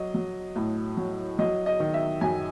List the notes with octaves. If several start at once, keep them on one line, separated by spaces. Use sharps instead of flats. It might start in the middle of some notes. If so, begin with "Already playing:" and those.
Already playing: F#3 D#5
F#3
A2
F#3
F#3 D#5
D#5
D#3
E5
F#2 G#5